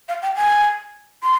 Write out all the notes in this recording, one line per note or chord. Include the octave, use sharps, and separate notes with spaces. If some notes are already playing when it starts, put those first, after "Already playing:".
F5
G5
G#5
C6